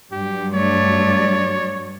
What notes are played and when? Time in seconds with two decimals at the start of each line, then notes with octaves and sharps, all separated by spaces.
0.12 G2 F#3 G4
0.54 A3 C#5 D5